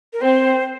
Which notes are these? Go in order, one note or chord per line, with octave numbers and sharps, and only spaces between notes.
A#4
C4 C5